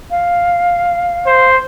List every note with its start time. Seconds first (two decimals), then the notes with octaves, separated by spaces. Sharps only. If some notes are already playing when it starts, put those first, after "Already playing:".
0.11 F5
1.26 C5